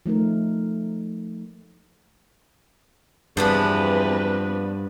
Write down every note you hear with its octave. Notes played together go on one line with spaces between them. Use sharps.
F3 A3 D#4 A#4
E2 G2 F3 B3 C4 D4 B4